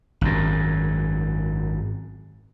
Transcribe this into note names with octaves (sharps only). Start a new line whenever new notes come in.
G#1 F#2